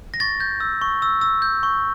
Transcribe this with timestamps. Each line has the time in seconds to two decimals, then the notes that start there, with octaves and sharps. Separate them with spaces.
0.14 A#6
0.20 C#6 A6
0.40 G6
0.60 E6
0.81 C#6
1.02 E6
1.21 E6
1.42 G6
1.63 C#6